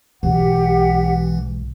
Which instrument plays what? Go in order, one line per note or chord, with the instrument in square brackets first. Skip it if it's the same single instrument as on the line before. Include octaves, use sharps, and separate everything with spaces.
[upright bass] B1 G#2 [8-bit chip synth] E3 [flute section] G4 F#5